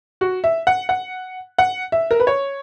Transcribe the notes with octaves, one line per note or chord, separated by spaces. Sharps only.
F#4
E5
F#5
F#5
F#5
E5
A#4
B4
C#5